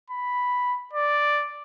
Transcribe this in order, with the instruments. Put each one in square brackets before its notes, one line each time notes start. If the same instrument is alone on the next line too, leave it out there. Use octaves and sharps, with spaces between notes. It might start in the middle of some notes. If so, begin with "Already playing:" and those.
[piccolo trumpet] B5
D5